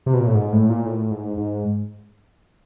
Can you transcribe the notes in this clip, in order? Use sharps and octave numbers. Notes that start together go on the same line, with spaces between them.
C3
B2
A#2
A2
G#2
A2
A#2
A2
G#2
G#2